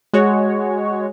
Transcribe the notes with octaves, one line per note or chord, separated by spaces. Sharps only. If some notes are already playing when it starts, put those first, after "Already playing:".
G#3 F#4 C#5